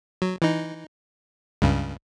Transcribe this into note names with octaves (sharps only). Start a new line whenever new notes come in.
F#3
E3 D#4
C#2 G2 C#3